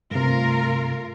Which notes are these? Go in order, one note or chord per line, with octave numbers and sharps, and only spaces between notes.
G2 C3 A3 F4 A#4